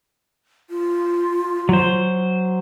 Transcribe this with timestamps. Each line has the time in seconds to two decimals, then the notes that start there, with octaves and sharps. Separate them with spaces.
0.70 F4
1.69 F#3 C5